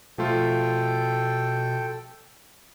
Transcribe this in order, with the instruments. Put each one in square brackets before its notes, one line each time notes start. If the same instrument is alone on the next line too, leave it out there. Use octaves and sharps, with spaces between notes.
[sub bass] B2 [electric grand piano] F3 A3 F4 [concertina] A4 G5